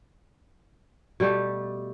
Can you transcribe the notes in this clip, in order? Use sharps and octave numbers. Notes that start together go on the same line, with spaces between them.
B2 G3 A3 G4